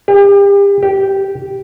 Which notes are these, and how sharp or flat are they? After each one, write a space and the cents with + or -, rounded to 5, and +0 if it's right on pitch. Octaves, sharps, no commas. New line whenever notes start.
G4 +35
G4 -10